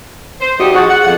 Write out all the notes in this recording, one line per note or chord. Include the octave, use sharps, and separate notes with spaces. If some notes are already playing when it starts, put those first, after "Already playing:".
C5
E2 D#4 F#4 G4
F3 D4 F#4 G#4 C#6 A6
F#5
F2 F#5